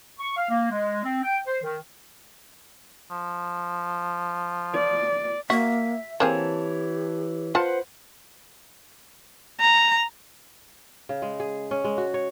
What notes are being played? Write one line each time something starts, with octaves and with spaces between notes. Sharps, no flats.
C#6
F5
A#3
G#3
C4
G5
C5
D#3
F3
D5
A#3 F#4 E5
E3 A#3 C4 G4 G#4 C#5 A5
F4 B4 C5 F#5 A5
A#5
C#3
G#3
G#4
C#4
G#3
F#4
C#5